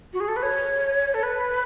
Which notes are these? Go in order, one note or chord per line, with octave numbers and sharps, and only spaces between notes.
F#4
G#4
A4
B4
C#5
A4
B4